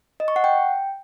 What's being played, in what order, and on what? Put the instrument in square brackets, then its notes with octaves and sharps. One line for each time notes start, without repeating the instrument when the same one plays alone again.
[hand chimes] D#5
C#6
F#5
G5